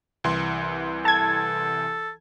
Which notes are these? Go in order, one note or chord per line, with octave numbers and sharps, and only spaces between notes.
C2 E3 C6
A4 A5 G#6